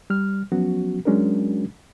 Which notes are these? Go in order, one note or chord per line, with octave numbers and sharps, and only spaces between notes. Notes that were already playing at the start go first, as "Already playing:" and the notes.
G3 F6
F3 F#3 B3 C#4 F#4
F#3 G#3 C#4 D4 F#4 A#4